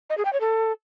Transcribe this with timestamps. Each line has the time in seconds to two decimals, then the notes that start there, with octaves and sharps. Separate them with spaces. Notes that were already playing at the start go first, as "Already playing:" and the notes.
0.10 D#5
0.17 G#4
0.25 G5
0.33 C#5
0.40 A4